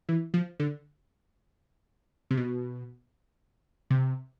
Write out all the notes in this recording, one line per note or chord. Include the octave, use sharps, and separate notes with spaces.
E3
F3
D3
C3
B2
C3